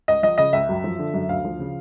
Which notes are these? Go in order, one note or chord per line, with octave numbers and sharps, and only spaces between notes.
C#2 D#5
F3 D#5
C#3 D#5
C#2 E5
F#2
F3
D3
F#2
D2 F5
F3
C#3